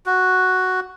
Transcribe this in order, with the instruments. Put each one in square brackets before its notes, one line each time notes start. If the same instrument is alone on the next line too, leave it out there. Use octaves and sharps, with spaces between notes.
[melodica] F#4